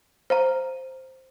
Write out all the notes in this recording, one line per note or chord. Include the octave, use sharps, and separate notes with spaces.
C5 F5 A#5